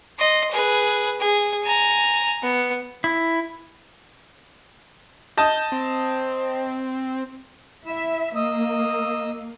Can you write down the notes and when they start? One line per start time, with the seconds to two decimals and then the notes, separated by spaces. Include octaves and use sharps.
0.19 D#5 C6
0.51 G#4 B4
1.20 G#4
1.63 G#5 A#5
2.42 B3
3.04 E4
5.37 D#5 A5 D#6 G6
5.72 C4
7.85 E4 E5
8.35 A#3 D#5 D#6 E6